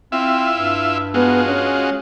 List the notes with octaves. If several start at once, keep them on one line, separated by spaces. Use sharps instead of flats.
C4 E4 F4 E5
G2
G#3 B3 F4 F#4
C#4